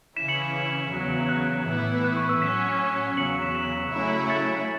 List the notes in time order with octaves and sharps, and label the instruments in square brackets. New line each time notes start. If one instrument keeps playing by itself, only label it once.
[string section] C#3 E3 C#4 E4 [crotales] B6 E7
[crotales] C#7 F#7
B6 E7
[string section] E2 C#3 F#3
[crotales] F#6
[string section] A2 E3 B3 E4
[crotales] F#6
C#6
E6
[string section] A2 F#3 C#4 [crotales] B6 E7
[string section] E2 C#3 F#3 [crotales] C#7 F#7
[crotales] C#7 F#7
B6 E7
B6 E7
[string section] C#3 F#3 A3 C#4 E4
[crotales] A6 C#7